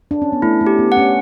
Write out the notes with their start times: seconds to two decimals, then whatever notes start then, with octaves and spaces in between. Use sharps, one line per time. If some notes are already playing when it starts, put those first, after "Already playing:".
0.11 D4
0.22 C#4
0.32 B3
0.42 A3 E4
0.61 A3
0.67 G4
0.79 B3
0.92 F#5
0.97 C#4